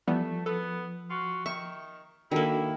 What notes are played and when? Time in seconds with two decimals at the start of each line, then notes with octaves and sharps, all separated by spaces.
0.08 E3 F3 G3 A3 B3
0.46 B3 A4
1.10 F4 F#4
1.46 D#3 E5 C#6
2.32 D#3 A#3 D4 E4 F#4 A4